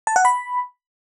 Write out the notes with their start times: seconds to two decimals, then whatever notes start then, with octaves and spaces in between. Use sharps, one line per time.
0.07 A5
0.16 F#5
0.25 B5